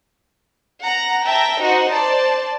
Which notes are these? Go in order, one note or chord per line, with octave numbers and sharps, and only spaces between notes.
F#5 A#5
E5 G5 A5 A#5
D#4 F#4 C5
C5 D5 A5